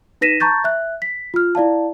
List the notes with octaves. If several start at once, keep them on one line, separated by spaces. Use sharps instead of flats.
D#4 B4 A#6 B6 D#7 E7
A5 A#5 C#6 G6 A6
E5 F#6
B6
F4 F6
E4 D5 F5 A5